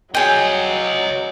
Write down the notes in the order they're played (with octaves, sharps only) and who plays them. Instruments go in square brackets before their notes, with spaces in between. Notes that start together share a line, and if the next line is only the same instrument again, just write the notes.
[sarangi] F#3 [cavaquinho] G#4 G5 [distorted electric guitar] C#5 D#5